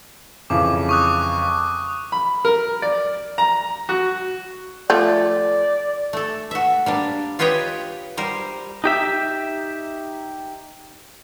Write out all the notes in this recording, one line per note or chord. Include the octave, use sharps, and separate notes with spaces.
F2 C#3 E3 D6
C#6 D#6 F#6
B5
A#4
D5
A#5
F#4
F3 A3 D5
A3 A4
F#4 E5
G3 A#3 D4
F4 G4 B4 C#5 D#5 G5
G3 A#4 C5
D#4 G4 E5